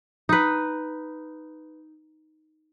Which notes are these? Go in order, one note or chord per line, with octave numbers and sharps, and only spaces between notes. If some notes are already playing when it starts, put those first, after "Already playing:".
D#4 B4